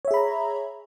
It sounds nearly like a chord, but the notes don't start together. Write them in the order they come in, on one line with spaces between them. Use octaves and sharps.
C#5 E5 G#4 B5 A#5